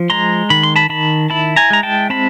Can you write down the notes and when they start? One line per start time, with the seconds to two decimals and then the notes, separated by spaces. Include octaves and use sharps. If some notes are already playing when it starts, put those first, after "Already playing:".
Already playing: F3
0.10 G#3 A#5 C6
0.50 D#3 B5
0.63 C6
0.76 A5 B5
0.90 D#3 A5 B5
1.30 E4 A5 B5
1.56 G#5 A#5
1.70 G#3 A#5
1.83 G5 A5
2.10 C4 A5 B5